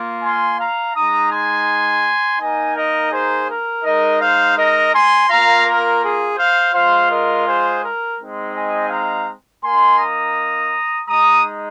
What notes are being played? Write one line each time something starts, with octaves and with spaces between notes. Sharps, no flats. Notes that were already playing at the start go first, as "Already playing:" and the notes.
Already playing: A#3 F4
G#5 C6
F5 A#5
G#3 D#4 A#5 D#6
G#5 C6
A#3 D#4 D#5 G#5
A#4 D#5
G#4 C5
A#4
G#3 D#4 A#4 D#5
C5 F5
A#4 D#5
G#5 C6
A#3 F4 F5 A#5
A#4
G#4
C5 F5
G#3 F4 C5 F5
A#4 D#5
G#4 C5
A#4
G#3 C4 D#4
D#5 G#5
F5 A#5
A#3 D#4 G#5 C6
A#5 D#6
G#3 D#4 A#5 D#6